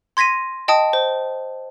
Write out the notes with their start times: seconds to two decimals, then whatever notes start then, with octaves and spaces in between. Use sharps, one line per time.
0.17 C6 G#6 A#6 B6 D#7
0.68 D#5 G5 A5 D#6
0.93 C5